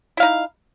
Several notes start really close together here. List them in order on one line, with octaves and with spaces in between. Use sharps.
E4 F5 D#4